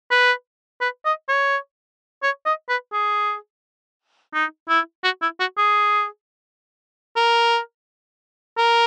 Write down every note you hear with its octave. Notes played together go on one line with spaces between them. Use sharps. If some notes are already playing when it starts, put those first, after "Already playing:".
B4
B4
D#5
C#5
C#5
D#5
B4
G#4
D#4
E4
F#4
E4
F#4
G#4
A#4
A#4